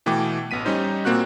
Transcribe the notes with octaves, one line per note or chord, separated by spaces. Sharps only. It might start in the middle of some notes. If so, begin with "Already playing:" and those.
B2 E3 A3 G5 D6
A1 B3 B6 D#7
G3 C#4 D#4 C5
A#2 A#3 C4 F#4 F#6